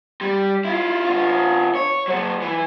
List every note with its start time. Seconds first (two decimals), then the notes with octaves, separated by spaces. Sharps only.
0.21 G3
0.65 E4 F4
1.06 D3 F4
1.75 C#5
2.08 C#3 F#3
2.42 E3